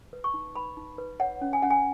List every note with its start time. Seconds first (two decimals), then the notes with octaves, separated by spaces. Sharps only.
0.13 B4
0.24 C#6
0.34 D#4
0.55 B4 B5
0.77 D#4
0.98 B4
1.20 C#5 F#5
1.41 C#4
1.53 G#5
1.62 C#4 F#5
1.70 G#5